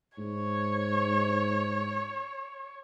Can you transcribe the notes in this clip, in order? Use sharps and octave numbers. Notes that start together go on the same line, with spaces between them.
G#2 C#5